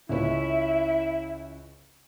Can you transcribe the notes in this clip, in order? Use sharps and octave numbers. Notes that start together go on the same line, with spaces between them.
C#2 C#4 E4 E5